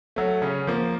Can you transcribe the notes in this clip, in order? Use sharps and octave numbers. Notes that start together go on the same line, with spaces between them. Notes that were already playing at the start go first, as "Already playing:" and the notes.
F#3 A3
C#3 C#4
F3 A#3